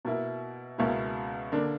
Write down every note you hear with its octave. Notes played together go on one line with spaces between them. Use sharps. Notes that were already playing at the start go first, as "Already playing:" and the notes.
B2 A#3 E4
C#2 B2 A#3 C#4 E4
D3 A#3 D4